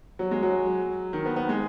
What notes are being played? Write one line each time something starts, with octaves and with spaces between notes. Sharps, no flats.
F#3
G#3
F#3
D#3
B3
B3
G#3